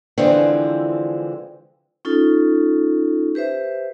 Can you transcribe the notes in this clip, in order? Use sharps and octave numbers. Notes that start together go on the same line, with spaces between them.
D3 E3 F3 G#3 C4
C#4 D#4 F4 A4
G4 B4 C5 E5